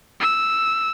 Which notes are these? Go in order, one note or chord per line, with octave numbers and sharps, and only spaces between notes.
E6